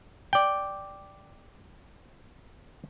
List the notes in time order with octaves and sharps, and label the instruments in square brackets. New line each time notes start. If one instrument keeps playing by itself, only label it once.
[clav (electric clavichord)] D5 G5